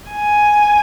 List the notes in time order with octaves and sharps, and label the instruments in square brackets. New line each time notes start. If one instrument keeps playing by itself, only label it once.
[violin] G#5